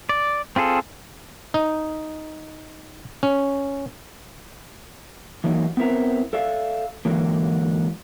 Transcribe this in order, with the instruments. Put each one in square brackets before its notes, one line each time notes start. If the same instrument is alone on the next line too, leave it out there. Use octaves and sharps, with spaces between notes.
[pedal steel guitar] D5
C4 F4 G#4 A4
[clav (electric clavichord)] D#4
C#4
[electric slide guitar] E3 F#3 A#3 D#4
B3 C4 E4 A#4 B4 A#5
A4 D5 E5 F5
G#2 D3 E3 F#3 A#3